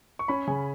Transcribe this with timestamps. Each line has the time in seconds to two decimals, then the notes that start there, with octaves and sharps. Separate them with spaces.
0.19 C#6
0.28 C#4 B5
0.47 C#3 G#5